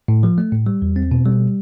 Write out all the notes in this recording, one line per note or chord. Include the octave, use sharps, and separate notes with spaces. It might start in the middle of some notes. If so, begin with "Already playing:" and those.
A2
F3
A3
A2
G3
E2
C4
B2
G3